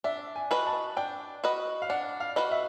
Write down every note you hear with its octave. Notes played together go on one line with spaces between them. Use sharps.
D4 E5
G#5
F#4 B4 D#5
A5
D4 G5
F#4 B4 D#5
F5
D4 F#5
F5
F#4 B4 D#5
E5